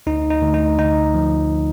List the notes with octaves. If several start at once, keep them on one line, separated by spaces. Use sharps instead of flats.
D2 D#4
D#4
D2
D#4
D3 D#4
F3